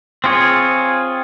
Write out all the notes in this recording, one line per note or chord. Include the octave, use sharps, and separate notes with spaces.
C4 F4 G#4 C#5